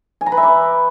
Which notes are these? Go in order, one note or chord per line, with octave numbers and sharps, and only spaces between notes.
G#5
A#5
B4
E5
D6